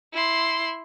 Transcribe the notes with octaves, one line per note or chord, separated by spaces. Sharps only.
E4 C6